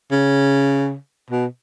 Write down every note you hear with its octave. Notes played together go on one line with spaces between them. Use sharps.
C#3
B2